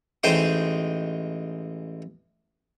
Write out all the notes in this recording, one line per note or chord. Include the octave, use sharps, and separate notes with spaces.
A1 G#3 D#4 C5 G5 C6